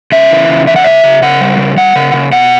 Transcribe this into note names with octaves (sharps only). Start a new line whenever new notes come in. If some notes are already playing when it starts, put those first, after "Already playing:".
C#3 E5
E3
C#3
E3 E5
F#5
C#3 E5
C#3
C#3 F#5
G3
C#3
G3 F#5
C#3
C#3
B2 F#5